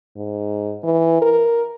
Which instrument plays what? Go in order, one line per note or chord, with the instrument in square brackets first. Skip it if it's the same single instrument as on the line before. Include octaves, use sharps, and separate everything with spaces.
[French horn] G#2
E3
A#4